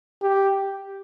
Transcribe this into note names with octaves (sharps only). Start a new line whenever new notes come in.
G4